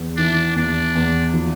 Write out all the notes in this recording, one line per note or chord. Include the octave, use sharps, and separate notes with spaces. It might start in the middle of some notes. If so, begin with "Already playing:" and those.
Already playing: E2
E3 D4
E2 D4
E2
F3